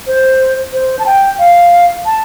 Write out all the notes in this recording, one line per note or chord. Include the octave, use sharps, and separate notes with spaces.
C5
C5
A5
G5
F5
A5